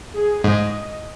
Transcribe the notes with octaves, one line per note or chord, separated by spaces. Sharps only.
G#4
G#2 D#5